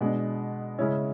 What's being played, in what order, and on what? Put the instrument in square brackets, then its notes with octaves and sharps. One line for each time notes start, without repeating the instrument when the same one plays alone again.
[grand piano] B2 G#3 D4
C#3 G#3 C#4 E4